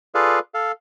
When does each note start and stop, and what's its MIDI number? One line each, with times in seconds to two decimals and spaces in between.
0.15 0.39 65
0.15 0.39 68
0.15 0.39 69
0.15 0.39 71
0.15 0.39 74
0.15 0.39 77
0.54 0.72 69
0.54 0.72 77